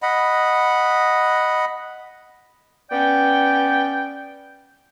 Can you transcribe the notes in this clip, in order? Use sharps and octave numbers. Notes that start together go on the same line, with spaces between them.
D#5 F#5 B5
B3 C#4 D5 G5